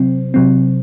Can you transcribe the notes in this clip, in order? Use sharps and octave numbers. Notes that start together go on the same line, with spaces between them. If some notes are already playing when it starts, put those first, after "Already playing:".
Already playing: C3 F#3 C4
C3 F#3 C4